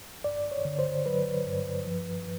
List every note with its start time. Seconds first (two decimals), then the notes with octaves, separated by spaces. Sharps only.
0.24 G2 D5
0.51 C#5
0.65 D3
0.79 C5
1.06 F#3 B4
1.46 G2
1.86 F3